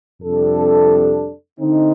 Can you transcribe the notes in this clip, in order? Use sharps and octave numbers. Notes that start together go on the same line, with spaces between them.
F2 C3 G3 D4 A4
D3 A3 C4 D#4